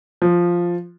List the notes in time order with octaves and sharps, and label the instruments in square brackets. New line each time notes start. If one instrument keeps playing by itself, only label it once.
[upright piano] F3